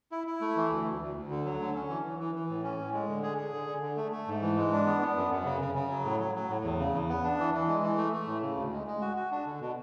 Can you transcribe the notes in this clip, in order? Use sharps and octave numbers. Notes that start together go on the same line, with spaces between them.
E4
E4
A3
E3
D2
D2
D2
D2
D3
F#3
D3
C#4
E3
E3
E3
E3
A2
C#4
A2
G#3
D3
G#4
G#4
D3
D3
D3
A3
A3
G#2
E3
G#3
D4
B3
B3
F#2
F#2
C#3
C#3
C#3
F#3
A2
F#3
F#3
A2
E2
C#3
E2
B3
D4
E3
E3
G#3
E3
A3
A3
A2
C#3
D2
G#3
G#3
F#4
F#4
D4
D3
B2